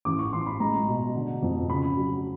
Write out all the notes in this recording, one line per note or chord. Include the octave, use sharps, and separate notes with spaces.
A1 D6
C#6
A1 C6
B5
G#3 A#5
B2
D3
F2
C#3 B5
F#3